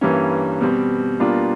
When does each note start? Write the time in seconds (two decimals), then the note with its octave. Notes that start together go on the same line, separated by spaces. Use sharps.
0.01 G2 E3 G3 A#3 C#4
0.61 B2 G3 C4
1.20 B2 G3 A#3 D4 F4